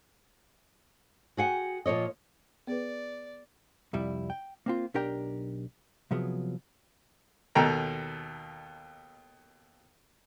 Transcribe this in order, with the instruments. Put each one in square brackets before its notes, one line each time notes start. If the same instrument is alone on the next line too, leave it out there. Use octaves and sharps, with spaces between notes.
[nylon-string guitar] F#4 G#4 F#5 G5
A#2 F3 C#5 D#5
[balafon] B3 G#4 B4 [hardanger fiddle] D5
[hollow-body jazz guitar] C2 F2 G3 E4
G5
A#3 C4 F4
B1 D4 G4 A#4 G5
C3 F3 F#3 B3 G#4
[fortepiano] D#2 B2 A4 G5 A#5